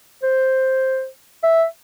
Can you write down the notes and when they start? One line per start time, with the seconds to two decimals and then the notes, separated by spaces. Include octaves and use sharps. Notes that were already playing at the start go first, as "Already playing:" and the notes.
0.23 C5
1.43 E5